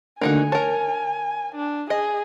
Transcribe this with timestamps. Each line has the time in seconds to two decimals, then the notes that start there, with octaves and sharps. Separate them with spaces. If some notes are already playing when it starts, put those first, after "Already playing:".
0.22 D3 A3 A#3 D4 D#4 F#4 G#5
0.52 A#4 C#5 A5
1.55 D4
1.90 G#4 D#5